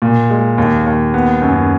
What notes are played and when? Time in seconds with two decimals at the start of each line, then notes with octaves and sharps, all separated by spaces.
0.02 A#2
0.30 G#3
0.58 D#2
0.86 D#2
1.14 B3
1.42 F#2